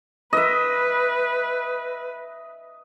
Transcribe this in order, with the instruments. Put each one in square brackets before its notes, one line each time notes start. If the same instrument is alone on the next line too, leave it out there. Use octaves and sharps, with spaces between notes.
[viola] B4 [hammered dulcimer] D#5 E5